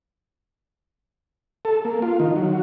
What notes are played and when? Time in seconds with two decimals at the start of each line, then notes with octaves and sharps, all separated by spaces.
1.65 A4
1.85 A#3
2.02 F4
2.19 D#3
2.36 F#3